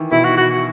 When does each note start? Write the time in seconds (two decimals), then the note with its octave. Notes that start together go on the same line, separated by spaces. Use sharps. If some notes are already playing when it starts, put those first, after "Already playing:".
Already playing: D#3 E3
0.12 B2 E4
0.24 F#4
0.37 F#4